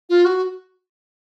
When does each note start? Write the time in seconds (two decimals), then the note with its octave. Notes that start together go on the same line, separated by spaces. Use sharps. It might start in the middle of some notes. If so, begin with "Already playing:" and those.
0.09 F4
0.25 F#4